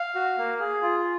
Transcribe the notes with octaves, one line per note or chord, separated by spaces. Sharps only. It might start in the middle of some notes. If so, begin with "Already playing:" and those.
Already playing: F5
F#4
A#3
G#4
F4